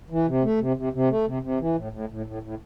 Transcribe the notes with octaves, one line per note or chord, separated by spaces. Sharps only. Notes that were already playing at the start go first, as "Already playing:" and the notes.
E3
C3
A3
C3
C3
C3
A3
C3
C3
E3
A2
A2
A2
A2
A2